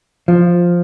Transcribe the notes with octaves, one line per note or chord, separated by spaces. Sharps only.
F3